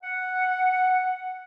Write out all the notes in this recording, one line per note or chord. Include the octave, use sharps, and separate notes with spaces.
F#5